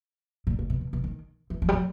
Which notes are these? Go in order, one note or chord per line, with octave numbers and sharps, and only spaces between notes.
A#2
A#2
B2
B2
B2
D#3
E3
F3
G3
F#3